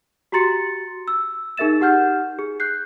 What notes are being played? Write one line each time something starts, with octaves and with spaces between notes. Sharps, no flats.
F#4 G4 A#5 C6 A6 C#7
E6
D#4 G#4 A#4 E5 A6 E7
D#4 G4 F#5 F6 G6
G#4
F#6 G6 C7